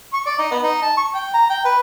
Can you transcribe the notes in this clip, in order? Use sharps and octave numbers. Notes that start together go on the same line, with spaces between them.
C#6
D5
D#4
B3
D#4
A5
C#6
G5
A#5
G5
B4